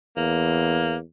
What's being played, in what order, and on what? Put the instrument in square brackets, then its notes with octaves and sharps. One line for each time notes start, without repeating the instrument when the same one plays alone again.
[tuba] E2 [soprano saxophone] A#3